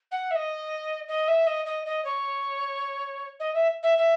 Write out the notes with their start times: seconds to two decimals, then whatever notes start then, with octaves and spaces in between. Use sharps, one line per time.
0.11 F#5
0.31 E5
0.35 D#5
1.08 D#5
1.27 E5
1.46 D#5
1.65 D#5
1.85 D#5
2.04 C#5
3.40 D#5
3.54 E5
3.83 E5
3.97 E5